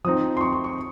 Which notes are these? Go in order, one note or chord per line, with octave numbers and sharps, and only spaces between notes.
F3 C4 D#4 D#6
C6
C#6
C#6
C#6